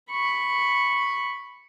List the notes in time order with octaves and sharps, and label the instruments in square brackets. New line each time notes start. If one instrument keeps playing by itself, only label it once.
[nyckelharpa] B5 C#6